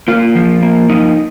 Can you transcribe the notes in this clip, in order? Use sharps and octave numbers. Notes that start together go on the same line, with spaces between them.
A#3 F4
F3
A#3
F3 D#4